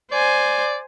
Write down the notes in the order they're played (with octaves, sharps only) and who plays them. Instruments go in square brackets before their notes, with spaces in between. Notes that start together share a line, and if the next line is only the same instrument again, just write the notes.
[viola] C5 G#5 [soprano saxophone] D5